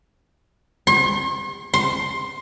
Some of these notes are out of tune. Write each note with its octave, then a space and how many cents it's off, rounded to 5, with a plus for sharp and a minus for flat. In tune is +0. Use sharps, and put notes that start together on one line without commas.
C6 +45
C6 +15